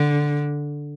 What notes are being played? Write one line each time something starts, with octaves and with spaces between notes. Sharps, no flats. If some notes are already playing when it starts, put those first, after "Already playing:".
Already playing: D3